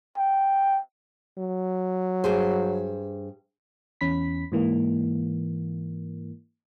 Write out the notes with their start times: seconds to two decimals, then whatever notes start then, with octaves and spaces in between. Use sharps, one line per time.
0.17 G5
1.37 F#3
2.24 G2 G#4 C5
4.01 E2 C#4 B5 B6
4.52 G#2 E3 A#3